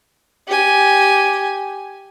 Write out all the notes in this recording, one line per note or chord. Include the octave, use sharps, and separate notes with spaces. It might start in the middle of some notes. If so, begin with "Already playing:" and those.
G4 G#5